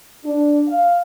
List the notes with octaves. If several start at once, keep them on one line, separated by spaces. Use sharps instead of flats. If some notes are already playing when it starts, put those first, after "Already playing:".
D4
F5